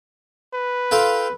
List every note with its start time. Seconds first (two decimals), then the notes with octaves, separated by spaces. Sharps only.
0.54 B4
0.91 F4 A4 G5